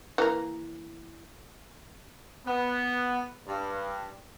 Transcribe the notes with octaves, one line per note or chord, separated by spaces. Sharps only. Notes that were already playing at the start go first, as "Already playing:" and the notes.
E3 A#3 A#4
B3
G2